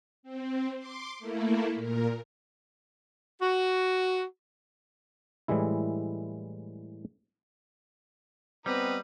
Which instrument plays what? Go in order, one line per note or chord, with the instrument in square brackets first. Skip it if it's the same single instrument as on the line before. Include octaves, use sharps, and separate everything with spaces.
[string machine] C4
C6 D6
A3 A#3 E4
A#2 A#4
[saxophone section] F#4
[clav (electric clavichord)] A2 E3 G3 G#3 E4
[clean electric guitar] G3 [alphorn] B3 [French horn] C4 [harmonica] D#4 B4 D#5